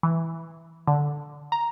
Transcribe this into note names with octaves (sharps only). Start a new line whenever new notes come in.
E3
D3
A#5